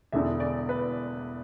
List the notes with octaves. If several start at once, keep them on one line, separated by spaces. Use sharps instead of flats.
E1 E2 D3 E5
D5
B4